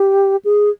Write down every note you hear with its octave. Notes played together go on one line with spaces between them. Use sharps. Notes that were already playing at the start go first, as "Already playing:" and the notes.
Already playing: G4
G#4